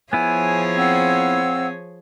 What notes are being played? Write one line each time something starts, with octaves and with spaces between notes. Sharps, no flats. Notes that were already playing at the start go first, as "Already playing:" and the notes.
F3 B3 E4 G#4 C#5 G#5
C4 F5 F#5 E6